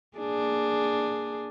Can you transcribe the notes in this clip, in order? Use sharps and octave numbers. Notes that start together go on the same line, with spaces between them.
A#3 D4 G#4